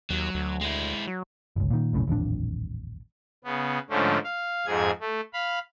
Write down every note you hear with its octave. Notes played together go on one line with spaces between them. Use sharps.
D#2 F#3
D2
G#3 E4
F#3
G1 C#2
A#2 D#3
F1 B1 A2 C#3
D#1 A1 F2 D4
C#3 B3
G#2 D3 F3 A3 C#4
F5
F2 G#2 G#4 G#6
A3
F5 B5